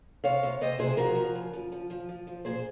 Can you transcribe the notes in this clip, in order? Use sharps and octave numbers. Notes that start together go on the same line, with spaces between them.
C3 C#5 F5
C3
C3 C5 D#5
C3 G#4 C5
F3 F#4 A#4
F3
C#3
F3
F3
F3
F3
F3
A#2 G#4 C5